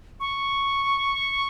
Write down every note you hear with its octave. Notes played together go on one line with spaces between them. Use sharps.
C#6